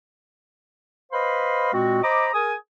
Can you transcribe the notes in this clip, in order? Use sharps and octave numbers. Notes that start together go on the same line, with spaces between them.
B4 C5 D#5 F5 B5 C6
A#2 G#3 C4 F#4
C5 D#5 A#5 B5 D6
G#4 A#4 G#5 D#6